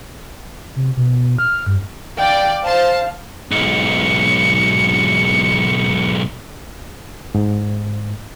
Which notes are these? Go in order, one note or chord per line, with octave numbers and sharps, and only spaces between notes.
C3
B2
F6
G2
D5 F5 G5
C5 F5 A5
B1 G#2 C#7
G#2